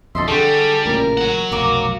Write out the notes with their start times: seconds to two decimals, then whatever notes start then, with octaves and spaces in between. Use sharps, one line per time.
0.15 F2 B2 D3 A4 D#5 E5 C6
0.28 D3 G3 F#4 G#4 A4 G5
0.86 A1 A#2 C#3 A#4
1.17 F#3 F#5
1.52 F1 B1 A#4 F5 A#5 D6